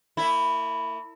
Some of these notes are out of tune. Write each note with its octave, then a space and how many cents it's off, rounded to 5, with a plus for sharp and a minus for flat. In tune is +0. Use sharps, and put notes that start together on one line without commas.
A#3 -40 E4 +0